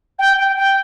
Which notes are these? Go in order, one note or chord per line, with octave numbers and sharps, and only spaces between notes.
G5
G5
G5